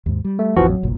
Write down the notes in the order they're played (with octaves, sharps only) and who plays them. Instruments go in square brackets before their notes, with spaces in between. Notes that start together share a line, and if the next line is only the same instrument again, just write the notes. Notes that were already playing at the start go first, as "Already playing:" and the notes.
[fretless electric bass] D#2 G#2
G3
[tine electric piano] A3
[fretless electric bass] A1 F2 [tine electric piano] E3 F3 F#4
[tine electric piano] F#3
[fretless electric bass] F#1 B1 A#2